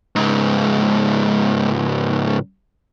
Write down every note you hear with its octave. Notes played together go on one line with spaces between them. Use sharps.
C#2 G#2